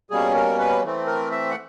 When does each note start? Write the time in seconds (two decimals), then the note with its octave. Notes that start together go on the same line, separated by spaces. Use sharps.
0.11 B2 G3 A#3 C#4 G#4
0.35 A#4
0.59 B4
0.83 E3 A3 C4
1.07 A#4
1.31 E5
1.51 F#5